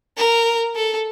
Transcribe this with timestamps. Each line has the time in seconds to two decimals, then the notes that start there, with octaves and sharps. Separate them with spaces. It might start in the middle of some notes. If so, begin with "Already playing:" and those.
0.17 A#4
0.76 A4